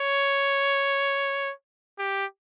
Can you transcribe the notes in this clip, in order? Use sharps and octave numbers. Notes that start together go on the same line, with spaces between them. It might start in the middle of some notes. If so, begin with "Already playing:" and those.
Already playing: C#5
G4